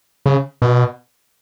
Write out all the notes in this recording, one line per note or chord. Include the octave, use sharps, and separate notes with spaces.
C#3
B2